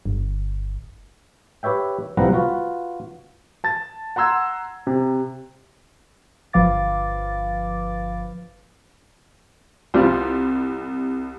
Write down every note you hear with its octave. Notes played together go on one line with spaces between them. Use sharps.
G1
G4 B4 C#5 E5 G5
C2 F3 G3 B3 F#5 A#5
F4 F#4 B4
A5 A6
F#5 A#5 C6 E6 G#6
C3
G1 F3 B4 F5 D6 A6
C2 F3 G3